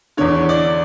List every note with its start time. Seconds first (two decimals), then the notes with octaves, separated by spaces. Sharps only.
0.17 E2 D3 C#5
0.49 D5